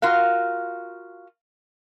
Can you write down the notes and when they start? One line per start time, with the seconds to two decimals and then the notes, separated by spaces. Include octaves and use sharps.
0.02 F4 F#4 A#4 F5